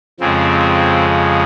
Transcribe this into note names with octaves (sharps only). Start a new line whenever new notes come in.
F2 C#3 F3 G#3 C4